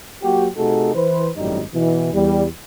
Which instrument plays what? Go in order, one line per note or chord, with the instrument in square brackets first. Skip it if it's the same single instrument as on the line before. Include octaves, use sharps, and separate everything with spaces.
[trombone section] F#3 A#3 F#4 G4
C3 A3 D#4 F#4 G#4 A4
E3 B4 C5
G#1 F#2 A2 G3 D#4
B2 E3
E2 G3